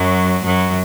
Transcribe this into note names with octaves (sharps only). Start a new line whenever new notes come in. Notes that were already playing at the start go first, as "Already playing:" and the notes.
Already playing: F#2 F#3
F#2 F#3